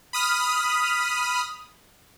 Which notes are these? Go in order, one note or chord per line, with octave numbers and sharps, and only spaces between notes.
B5 D#6 F6